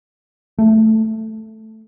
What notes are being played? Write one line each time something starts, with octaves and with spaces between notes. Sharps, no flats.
A3